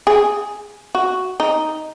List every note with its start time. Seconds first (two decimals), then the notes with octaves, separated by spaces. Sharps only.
0.07 G#4
0.95 F#4
1.40 D#4